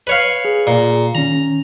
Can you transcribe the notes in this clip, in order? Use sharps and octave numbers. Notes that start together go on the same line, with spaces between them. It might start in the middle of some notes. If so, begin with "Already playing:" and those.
B4 C#5 F5
G#4
A#2
D#3 C#4 A#5